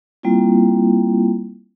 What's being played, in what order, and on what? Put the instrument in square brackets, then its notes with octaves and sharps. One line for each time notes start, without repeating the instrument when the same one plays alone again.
[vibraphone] G3 A#3 C4 E4 F4